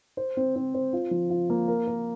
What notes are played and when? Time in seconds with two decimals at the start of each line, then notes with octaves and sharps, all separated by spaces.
0.17 C5
0.37 C4
0.56 C4
0.74 C5
0.93 F4
1.11 F3
1.30 F4
1.50 A#3
1.68 A#4
1.87 A#4